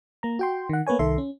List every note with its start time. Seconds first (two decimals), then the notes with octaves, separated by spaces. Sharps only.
0.23 A#3 A#5
0.39 F#4 G5 C6
0.69 D#3 F#5
0.87 A#3 B3 B4 C#5 G#5
0.99 C2 D#3 A4 E5 C6
1.18 C#4